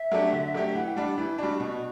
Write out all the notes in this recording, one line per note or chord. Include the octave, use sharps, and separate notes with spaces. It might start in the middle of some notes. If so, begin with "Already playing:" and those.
Already playing: E5
F#3 A3 D4 G4
D3
F#3 A3 D4 G4
E3 F#5
G5
G3 D4 F#5
D5
E3 E4
G3 D4 F#4
B2